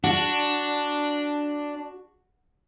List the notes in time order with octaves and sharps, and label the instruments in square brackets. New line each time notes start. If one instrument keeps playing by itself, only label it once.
[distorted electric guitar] D4 [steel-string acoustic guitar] F#4